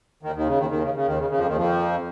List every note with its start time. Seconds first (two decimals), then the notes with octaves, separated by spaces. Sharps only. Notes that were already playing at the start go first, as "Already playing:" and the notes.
0.23 D#2 D#3
0.35 D#2 D#3
0.47 C#3
0.58 D#2 D#3
0.70 D#2 D#3
0.82 C#3
0.94 C#3
1.06 D#2 D#3
1.18 C#3
1.30 C#3
1.38 F2 F3
1.47 D#2 D#3
1.56 F2 F3